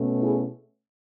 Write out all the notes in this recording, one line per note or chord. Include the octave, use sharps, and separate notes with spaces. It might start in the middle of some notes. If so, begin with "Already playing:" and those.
Already playing: B2 A3 C#4
E4 G#4